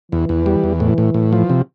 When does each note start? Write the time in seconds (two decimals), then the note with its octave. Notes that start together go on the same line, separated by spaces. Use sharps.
0.12 E2 E3
0.29 E2
0.46 G3
0.64 E2
0.80 A2
0.98 A2
1.14 A2
1.33 F3
1.50 C3